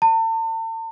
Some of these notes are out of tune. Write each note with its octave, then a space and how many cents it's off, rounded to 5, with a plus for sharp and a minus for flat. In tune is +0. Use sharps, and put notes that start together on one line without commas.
A5 +40